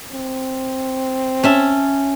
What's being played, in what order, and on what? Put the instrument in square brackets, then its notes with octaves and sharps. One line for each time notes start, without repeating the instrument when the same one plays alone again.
[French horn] C4
[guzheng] C#4 E5 A5